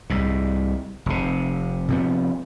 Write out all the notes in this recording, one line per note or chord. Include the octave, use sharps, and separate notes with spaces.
C2 G#2
F1 C3
C3 F3 B3